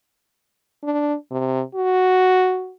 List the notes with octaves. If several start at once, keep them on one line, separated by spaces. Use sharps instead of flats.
D4
C3
F#4